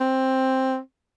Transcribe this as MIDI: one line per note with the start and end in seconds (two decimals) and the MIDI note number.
0.01 0.78 60